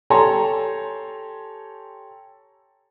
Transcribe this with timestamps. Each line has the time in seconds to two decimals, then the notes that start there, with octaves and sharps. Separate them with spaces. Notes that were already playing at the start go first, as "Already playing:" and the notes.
0.10 G4 A4 C#5 G#5 A#5 C6